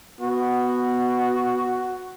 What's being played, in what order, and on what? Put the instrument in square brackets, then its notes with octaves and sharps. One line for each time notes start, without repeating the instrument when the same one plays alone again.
[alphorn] B3 [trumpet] F#4